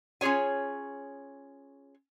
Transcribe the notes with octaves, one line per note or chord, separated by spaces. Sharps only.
C#4 F4 G#4 C#5 G#5